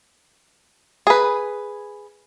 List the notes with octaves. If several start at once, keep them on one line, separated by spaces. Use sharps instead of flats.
G#4 B4